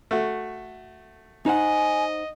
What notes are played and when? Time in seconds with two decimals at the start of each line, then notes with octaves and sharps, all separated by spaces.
0.11 A3 F#4
1.46 D#4 C5 D#5 F#5 G#5